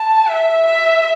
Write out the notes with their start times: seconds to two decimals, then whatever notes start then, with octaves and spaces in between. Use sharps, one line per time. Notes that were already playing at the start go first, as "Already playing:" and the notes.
Already playing: A5
0.28 E5
0.66 E5